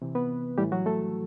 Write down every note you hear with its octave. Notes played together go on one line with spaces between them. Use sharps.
C3 E3
B3 B4
A2 E3 G3 G4
F#3 F#4
A3 A4